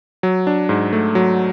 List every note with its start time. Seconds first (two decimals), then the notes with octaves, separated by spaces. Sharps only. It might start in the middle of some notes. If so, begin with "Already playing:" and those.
0.23 F#3
0.47 D4
0.69 G#2
0.93 A3
1.15 F#3